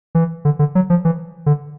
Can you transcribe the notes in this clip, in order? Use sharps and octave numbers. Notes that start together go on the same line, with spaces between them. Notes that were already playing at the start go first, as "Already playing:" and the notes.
E3
D3
D3
F#3
F3
E3
D3